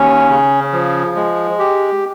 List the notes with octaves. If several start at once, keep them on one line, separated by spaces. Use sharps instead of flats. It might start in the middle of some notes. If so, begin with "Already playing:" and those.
Already playing: D#2 C#4
C#3
F3
G#3
G4